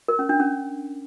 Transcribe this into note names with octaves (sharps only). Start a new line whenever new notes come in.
A#4
C#4
D4
C#4